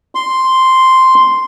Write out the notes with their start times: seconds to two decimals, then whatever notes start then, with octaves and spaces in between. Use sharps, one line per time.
0.15 C6